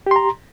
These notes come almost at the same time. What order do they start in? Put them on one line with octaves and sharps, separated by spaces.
G4 C6 A#5